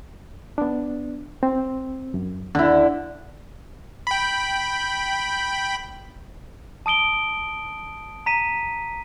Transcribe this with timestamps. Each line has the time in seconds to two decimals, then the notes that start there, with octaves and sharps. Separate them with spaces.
0.58 B3 D4
1.43 C4
2.14 F#2
2.55 D#2 D3 E4
4.07 G5 B5
6.86 A5 D#6 D7 G7
8.26 A#5 B6 D#7